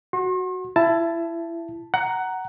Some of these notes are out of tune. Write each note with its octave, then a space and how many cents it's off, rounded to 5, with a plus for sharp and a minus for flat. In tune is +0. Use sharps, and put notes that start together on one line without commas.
F#4 +0 C6 +45
E4 +25 A5 +0
F#5 +15 A#5 +0